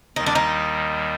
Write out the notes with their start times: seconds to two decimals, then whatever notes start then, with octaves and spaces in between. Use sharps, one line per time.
0.16 D#2 D#3 G3 D#4
0.26 D4
0.35 D#4